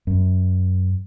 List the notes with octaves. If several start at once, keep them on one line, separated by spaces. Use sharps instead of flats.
F#2